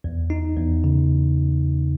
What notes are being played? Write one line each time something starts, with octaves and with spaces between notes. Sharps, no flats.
E2
D#4
E2
C#3